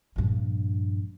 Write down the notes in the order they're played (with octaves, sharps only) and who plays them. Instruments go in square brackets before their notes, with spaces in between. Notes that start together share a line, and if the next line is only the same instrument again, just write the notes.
[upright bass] A#1 G2